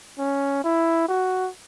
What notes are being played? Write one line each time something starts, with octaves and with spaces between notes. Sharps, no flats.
C#4
E4
F#4